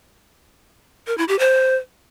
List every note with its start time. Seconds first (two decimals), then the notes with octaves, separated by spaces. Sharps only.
1.07 A#4
1.18 E4
1.28 G4
1.39 C5